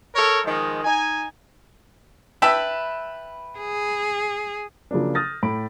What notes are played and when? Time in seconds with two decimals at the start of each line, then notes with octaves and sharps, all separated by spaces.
0.15 A4 A#4 C#5
0.44 D#3 F3 G#3
0.84 D#4 G#5
2.42 B4 E5 G5 A5 B5 E6
3.59 G#4
4.91 C#3 F3 F#3 A#3 D4
5.15 D#6 F6 G6 A6 A#6
5.43 A2 B5 D7